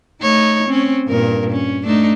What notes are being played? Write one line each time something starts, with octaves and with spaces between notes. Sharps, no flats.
A3 D#4 C#5
C4 C#4
G2 A#2 A#4
C#4
A3 D4 D#4